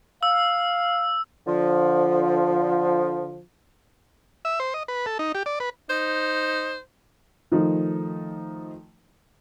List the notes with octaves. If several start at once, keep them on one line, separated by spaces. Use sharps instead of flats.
F5 E6
D3 F3
E5
C5
D#5
B4
A4
D#4
G4
D5
B4
D#4 C5
D#3 F3 A3 D#4